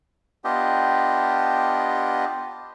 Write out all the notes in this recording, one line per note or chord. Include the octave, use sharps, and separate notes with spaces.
B3 D4 F4 G4 D#5